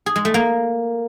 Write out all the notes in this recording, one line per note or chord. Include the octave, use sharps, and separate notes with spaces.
G#4
G#3
A3
A#3